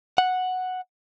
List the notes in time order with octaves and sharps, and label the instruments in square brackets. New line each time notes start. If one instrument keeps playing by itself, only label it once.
[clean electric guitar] F#5